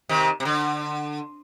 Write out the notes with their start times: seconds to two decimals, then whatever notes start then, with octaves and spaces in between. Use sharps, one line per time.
0.09 C3 D#3
0.40 C3
0.45 D3